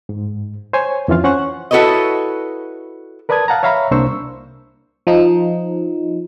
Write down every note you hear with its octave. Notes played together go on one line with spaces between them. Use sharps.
G#2
C5 C#5 G#5
F2 E3 C#4 F4 F5
C#4 C5 F#5 C#6 F#6
E4 F#4 A4 B4 C#5 D#5
A#4 B4 D5 A5 D#6 G#6
F5 F#5 A5 A#5
C#5 E5 F5 A#5 B5
C2 A#3 D4 C5 C#6 E6
F3 D#4